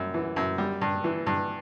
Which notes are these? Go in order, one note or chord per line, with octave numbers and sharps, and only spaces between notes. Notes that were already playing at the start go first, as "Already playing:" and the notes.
Already playing: F#2 G3
E3
F#2
G3
G2
E3
G2